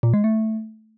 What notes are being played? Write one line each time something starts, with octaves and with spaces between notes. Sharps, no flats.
A#2
G#3
A3